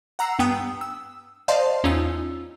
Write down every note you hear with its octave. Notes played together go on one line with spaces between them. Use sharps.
F#5 A#5 E6 C7
G2 B3 G5 D#6
E6
C5 D5 D#5 F5 A5 C6
E2 C#4 D#4 F4 E6